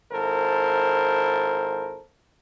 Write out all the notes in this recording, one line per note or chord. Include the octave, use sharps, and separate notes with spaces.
G#1 E4 A4 A#4 C5